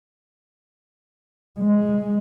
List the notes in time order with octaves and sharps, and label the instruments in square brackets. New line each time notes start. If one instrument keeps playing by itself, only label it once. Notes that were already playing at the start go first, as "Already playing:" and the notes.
[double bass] G#3